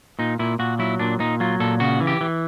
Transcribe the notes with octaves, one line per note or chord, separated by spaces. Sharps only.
A#2 D#4
A#2 E4
A#2 F#4
F#3 E4
A#2 D4
A#2 D#4
F#3 F4
A#2 A4
C#3 F#4
E3
G4
E3